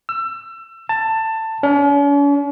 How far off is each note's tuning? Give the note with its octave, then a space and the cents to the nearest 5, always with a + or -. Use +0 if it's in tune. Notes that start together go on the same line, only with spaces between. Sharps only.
E6 +30
A5 +15
C#4 +45